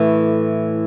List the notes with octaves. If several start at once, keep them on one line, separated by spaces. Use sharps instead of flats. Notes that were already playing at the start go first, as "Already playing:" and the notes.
Already playing: A2 E3 A3 E4